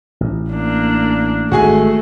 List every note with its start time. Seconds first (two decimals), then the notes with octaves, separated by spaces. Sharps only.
0.21 A1
0.51 A#3 D4
1.52 G#1 D#3 G#3 A3 F#4 G#4 G#5